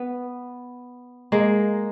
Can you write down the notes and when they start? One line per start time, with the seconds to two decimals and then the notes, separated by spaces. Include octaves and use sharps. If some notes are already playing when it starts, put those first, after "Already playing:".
Already playing: B3
1.32 G#3 A#3